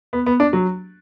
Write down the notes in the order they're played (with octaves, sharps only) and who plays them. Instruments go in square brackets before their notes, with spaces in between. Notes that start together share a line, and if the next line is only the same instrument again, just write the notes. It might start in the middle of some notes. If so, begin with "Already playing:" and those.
[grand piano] B3
B3
D4
F#3